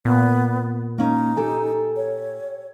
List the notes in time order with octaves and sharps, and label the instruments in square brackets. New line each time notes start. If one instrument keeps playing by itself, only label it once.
[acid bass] A#2 [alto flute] B3
[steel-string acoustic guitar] A#3 C#4 [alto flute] D#4
[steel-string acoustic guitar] G4 A4 G#5
[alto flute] C#5